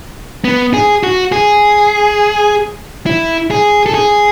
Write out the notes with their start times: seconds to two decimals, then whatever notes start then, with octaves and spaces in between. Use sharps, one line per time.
0.44 B3
0.74 G#4
1.03 F#4
1.32 G#4
3.06 E4
3.51 G#4
3.86 A4
3.94 G#4